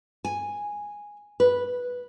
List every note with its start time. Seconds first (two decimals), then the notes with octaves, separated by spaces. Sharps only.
0.25 G#5
1.40 B4